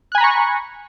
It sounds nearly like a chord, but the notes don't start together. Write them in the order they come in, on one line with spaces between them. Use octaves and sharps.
F#6 G#5 B5 A#5 C#6